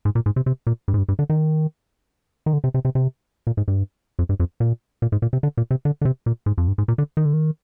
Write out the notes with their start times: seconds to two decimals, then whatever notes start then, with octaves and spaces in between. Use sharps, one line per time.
0.05 G#2
0.15 A#2
0.26 G#2
0.36 C3
0.46 C3
0.67 A#2
0.88 G2
0.94 G#2
0.98 G2
1.09 G2
1.19 D3
1.30 D#3
2.46 D#3
2.53 D3
2.64 C3
2.74 C3
2.85 C3
2.95 C3
3.47 A#2
3.57 G#2
3.68 G2
4.19 F2
4.29 G2
4.40 F2
4.60 A#2
5.02 A#2
5.12 G#2
5.22 A#2
5.33 C3
5.43 D3
5.57 A#2
5.71 C3
5.85 D3
6.01 D3
6.05 C3
6.26 A#2
6.46 G#2
6.58 F2
6.68 G2
6.78 G#2
6.88 A#2
6.98 D3
7.17 D#3
7.25 D3
7.33 D#3